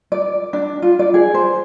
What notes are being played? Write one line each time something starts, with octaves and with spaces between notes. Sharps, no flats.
D5
D4
F4
D5
G#4
C5